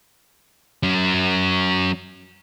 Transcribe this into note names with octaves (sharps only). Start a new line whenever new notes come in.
F#3 C#4